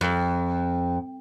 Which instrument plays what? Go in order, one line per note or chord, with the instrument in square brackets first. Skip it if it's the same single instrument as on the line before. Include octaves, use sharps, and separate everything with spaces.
[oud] F2